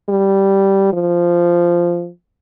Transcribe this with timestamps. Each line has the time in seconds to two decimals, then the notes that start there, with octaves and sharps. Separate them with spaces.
0.09 G3
0.93 F3